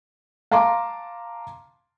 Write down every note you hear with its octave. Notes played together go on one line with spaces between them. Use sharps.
F5 A5 A#5 C6 D6